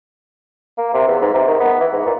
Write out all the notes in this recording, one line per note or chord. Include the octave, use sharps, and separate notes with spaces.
A#3
C3
E2
G#2
C3
D#3
B3
E3
G#2
A#2